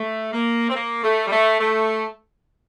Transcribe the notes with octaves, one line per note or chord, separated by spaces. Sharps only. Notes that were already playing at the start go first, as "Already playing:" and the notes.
Already playing: A3
A#3
C4
A#3
A3
G3
A3
A3